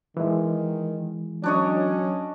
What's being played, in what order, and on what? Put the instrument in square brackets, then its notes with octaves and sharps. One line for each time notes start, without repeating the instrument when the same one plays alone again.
[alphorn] D#3 [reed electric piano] E3 G#3
[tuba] F#3 [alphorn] C#4 [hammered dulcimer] D4 C#5 D#5